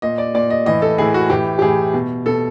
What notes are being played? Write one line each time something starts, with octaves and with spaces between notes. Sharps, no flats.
A#2 D#5
D5
A#2 D5
D#5
A2 E3 D#5
A4
A2 E3 G#4
F#4
A2 E3 G4
G4
A2 E3 G#4
B2
B2 A4